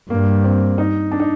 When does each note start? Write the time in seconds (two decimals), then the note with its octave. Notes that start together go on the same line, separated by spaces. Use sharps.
0.10 G2 A#3
0.44 C4
0.78 D#4
1.11 D4
1.20 D#4